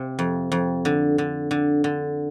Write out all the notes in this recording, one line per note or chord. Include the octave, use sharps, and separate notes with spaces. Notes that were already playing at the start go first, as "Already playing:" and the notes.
Already playing: C3
F2
F2
D3
D3
D3
D3